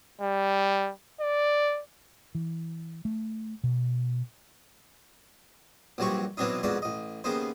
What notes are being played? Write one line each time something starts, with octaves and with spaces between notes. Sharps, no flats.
G3
D5
E3
A3
B2
A#1 G2 F#3 C4 G4 C#6
B2 E3 F#3 C4 D4 D#4
F2 G#2 B2 F#4 D5
A1 D#5
D#2 C#3 B3 D#4 C5